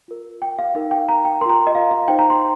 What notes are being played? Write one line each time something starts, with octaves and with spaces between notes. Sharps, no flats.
F4 A#4
G5
F5
D#4 A#4 F5
G5
A#5
G5
F4 A#4 A#5 C6
D#5
F5
F5
D#4 C5 G5
A#5
C6